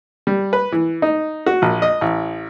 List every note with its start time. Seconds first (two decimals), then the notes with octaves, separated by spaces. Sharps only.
0.27 G3
0.53 B4
0.72 E3
1.02 D#4
1.46 F#4
1.62 A#1
1.82 D#5
2.01 A1